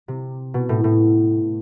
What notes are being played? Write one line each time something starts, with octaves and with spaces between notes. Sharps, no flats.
C3
B2
A2
A2